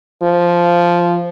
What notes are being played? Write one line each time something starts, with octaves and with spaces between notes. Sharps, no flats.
F3